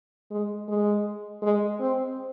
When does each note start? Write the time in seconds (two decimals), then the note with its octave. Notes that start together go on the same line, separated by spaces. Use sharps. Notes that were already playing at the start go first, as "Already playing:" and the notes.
0.31 G#3
0.68 G#3
1.42 G#3
1.80 C4